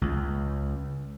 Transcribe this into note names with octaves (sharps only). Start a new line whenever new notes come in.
C#2